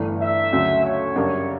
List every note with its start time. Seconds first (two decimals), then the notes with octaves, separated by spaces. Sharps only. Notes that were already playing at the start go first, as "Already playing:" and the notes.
Already playing: G1 G2 E3 A3
0.20 E5
0.52 D2 C#3 F#3 A3
0.84 C#5
1.16 F#2 C#3 G3 D4 C#5